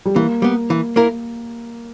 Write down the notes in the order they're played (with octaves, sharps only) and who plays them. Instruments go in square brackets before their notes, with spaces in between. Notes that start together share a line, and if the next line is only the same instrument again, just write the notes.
[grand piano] G3
[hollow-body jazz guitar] E3 [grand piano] A#3
[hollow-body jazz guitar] G3 B3
E3
A#3 E4 A#4